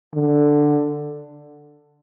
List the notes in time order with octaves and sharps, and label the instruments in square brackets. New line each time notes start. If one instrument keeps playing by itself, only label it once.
[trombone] D3